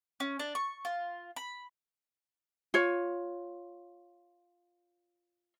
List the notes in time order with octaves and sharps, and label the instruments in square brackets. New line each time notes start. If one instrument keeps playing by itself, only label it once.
[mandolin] C#4
D4
C#6
F4
B5
[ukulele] F4 C#5